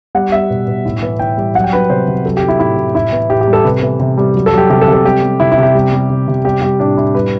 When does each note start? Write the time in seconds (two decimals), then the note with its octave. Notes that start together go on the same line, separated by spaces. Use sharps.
0.15 G3 F#5
0.32 G3 E5
0.50 B2
0.68 B2
0.85 A2
1.02 E3
1.19 A2 G5
1.37 G3
1.55 F#3 F#5
1.64 G5
1.72 F#3 B4
1.89 C3 C5
2.07 C3
2.25 F#3 A4
2.37 G4
2.43 F#3
2.48 E4
2.59 A2 E4
2.77 A2
2.95 A2 E4
3.12 E3
3.30 A2 G4
3.41 G4
3.48 G3
3.53 A4
3.64 C3 B4
3.82 E3
4.00 C3
4.17 G3
4.35 F#3
4.46 A4
4.53 F#3 G4
4.70 C3 G4
4.81 A4
4.88 C3
4.93 A4
5.04 G3 G4
5.22 G3
5.40 C3 E4
5.52 E4
5.58 C3
5.63 G4
5.75 G3
5.93 G3
6.10 C3
6.28 C3
6.44 G3 G4
6.62 G3 G4
6.79 A2 D4
6.97 A2 E4
7.15 G3 B4